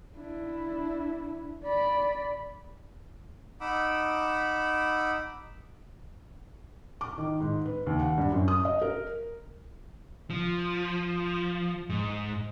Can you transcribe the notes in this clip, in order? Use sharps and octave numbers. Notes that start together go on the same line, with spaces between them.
D4 E4
D5 B5
D#4 F#5 B5 D6 E6
D6
D#3
G#2
B4
D#2
F#5
G2
F#2
D#6
D#5
A#4
F3
G#2